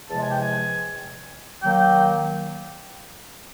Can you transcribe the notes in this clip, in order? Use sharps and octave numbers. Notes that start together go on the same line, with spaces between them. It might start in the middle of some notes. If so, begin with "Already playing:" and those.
E2 C3 F3 G#3 A5
G#5
G5
G#5
D#3 F#3 A#3 G5